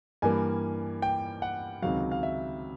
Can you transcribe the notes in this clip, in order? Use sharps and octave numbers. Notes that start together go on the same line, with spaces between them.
G2 E3 G3 A#3 G#5
G5
F#5
C#2 C3 D#3 F#3 F5
F5
E5